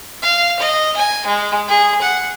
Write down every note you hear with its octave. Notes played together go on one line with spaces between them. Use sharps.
F5
D#5
G#5
G#3
G#4
F#5